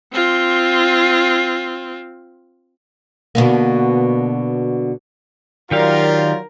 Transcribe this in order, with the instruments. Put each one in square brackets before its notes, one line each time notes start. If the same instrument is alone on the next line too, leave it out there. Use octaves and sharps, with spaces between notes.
[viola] C4 F4
[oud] B2 D3 A#3
[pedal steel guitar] D#3 G4 F5 [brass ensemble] F#3 F4 [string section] A#4 [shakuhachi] D5